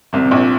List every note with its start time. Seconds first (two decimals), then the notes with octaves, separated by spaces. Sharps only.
0.13 C2 C3
0.25 C3
0.31 A#1 A#2